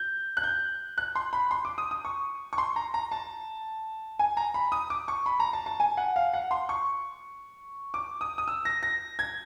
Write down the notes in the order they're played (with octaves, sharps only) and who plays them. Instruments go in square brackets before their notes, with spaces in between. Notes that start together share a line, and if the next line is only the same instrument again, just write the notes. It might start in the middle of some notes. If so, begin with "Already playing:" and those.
Already playing: [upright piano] G6
F#6
G6
F#6
C6
B5
C6
D6
D#6
D#6
C#6
C#6
C6
A#5
A#5
A5
G#5
A#5
B5
D#6
D6
C#6
B5
A#5
A5
A5
G#5
F#5
F5
F#5
C6
C#6
D6
D#6
D#6
E6
A#6
A#6
G#6